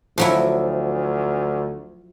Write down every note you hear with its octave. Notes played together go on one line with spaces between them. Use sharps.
D2 F3 F#3 E4